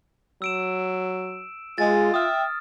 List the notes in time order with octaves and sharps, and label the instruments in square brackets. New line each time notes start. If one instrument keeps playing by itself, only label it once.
[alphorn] F#3 [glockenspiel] E6 D7 E7
[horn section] G#3 [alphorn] F4 [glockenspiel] A6
[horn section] E5 G5 [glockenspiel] D#6 F6